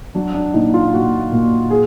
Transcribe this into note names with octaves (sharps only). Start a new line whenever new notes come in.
F#3 D4
D4
A#2 D#4
F4
A#2 F#4
A#2
G#4